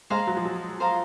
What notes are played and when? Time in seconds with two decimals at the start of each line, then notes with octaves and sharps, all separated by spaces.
0.10 G#3 C5 F5 A#5
0.27 F#3
0.37 F3
0.45 F#3
0.80 C5 F5 A#5